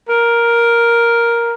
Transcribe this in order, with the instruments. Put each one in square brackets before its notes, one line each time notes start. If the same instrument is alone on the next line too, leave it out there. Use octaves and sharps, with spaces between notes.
[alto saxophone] A#4